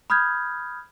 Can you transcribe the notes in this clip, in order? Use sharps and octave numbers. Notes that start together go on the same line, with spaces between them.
B5 D#6 F6 G6 G#6